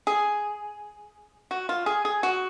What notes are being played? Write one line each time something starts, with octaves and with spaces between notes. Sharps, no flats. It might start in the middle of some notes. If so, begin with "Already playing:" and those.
G#4
F#4
F4
G#4
G#4
F#4